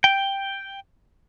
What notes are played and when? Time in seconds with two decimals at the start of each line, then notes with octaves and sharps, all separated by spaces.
0.04 G5